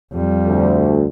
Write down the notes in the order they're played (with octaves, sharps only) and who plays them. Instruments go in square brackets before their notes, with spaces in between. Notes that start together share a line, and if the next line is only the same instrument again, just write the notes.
[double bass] F2 G3
[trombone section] D2